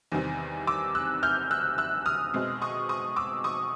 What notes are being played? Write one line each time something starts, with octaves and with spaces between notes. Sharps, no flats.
E2 C3 D#3 G3 C4
D6 E6
E6 F#6
F6 G6
E6 F#6
E6 F#6
D#6 F6
B2 G#3 C4
C#6 D#6
C#6 D#6
D6 E6
C#6 D#6